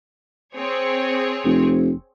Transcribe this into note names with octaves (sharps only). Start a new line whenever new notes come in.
C4 G#4 C#5
F1